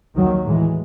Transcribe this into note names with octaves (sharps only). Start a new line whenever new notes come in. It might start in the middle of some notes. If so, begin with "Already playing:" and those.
D#2 D#3 F#3
A2 E3 G#3